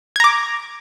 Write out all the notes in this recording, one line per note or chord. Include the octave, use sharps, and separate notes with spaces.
A#5 D6 G#6